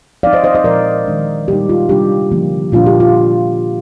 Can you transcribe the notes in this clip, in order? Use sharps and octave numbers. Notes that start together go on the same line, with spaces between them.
F3 C4 D#4 D5 F5
C5 D#5
C5 D#5
C5 D#5
A#2 F3 G#3 A#4 D5
D#3 G#3 D4
A#2 G3 A#3 D#4 G4
F4
C3 G3 D4 G4
D3 F3 A#3
A#2 F3 A#3 D4 F4
G4
F4